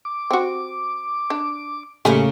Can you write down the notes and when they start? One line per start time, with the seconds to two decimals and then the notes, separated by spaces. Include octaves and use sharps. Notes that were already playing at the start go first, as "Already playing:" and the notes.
0.05 D6
0.31 C4 F#4
1.30 D4
2.05 A2 C#3 G3 A3 A#3 G#5